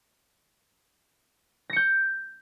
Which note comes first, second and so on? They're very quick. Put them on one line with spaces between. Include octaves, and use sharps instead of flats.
A#6 C#7 G6